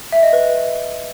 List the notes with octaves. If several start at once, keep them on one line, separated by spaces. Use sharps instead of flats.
E5
D#5
B4